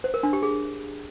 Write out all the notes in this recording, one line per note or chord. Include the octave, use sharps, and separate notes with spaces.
C5
A#4
D4
G4
G#4